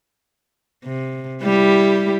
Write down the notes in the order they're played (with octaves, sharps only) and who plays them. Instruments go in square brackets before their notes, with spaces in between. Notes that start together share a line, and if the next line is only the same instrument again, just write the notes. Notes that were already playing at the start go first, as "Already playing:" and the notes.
[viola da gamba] C3
G3 E4 G4